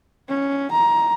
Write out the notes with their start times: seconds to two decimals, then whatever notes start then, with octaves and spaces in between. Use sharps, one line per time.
0.29 C#4
0.71 A#5